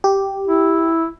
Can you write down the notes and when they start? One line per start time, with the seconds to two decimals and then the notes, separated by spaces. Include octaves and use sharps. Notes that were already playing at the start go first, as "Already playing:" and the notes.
0.04 G4
0.48 E4